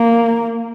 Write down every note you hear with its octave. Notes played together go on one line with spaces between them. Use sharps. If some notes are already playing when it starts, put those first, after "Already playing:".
Already playing: A#3